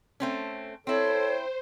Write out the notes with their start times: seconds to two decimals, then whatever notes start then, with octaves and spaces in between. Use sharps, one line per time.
0.20 A3 C4 C#4
0.87 C4 E4 A4 C5 C#5